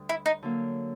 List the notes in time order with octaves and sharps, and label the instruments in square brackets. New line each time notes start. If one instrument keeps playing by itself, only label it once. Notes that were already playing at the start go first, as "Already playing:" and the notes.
Already playing: [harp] D2 D3 G3
[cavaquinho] E4
D#4
[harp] D3 F#3 A#3